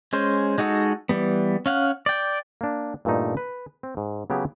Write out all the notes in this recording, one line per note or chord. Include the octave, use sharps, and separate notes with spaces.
G#3 C#4 C5
G#3 D#4 F#4 A4
E3 G3 B3
C#4 F5 F#5
D5 G5
A#3 D4
G2 A#2 E3 A3 D#4
B4
C4
G#2
C#3 F#3 B3 G4 G#4